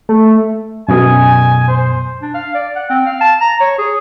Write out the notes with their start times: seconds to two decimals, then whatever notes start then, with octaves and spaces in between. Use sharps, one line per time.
0.09 A3
0.88 F#2 B2 G#5 D#6
1.68 C5
2.22 D4
2.34 F5
2.54 D5
2.75 F#5
2.90 C4
3.06 F5
3.21 A5
3.40 A#5
3.60 C#5
3.78 G#4